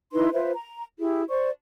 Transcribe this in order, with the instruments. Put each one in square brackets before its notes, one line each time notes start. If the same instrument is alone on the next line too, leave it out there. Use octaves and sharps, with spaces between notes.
[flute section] D#4 E4 B4 C6
F4 B4 C5 E5
A#5
E4 G4 G#4
C5 D5 C#6